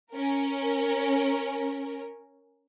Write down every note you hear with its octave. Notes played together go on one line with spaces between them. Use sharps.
C#4 A#4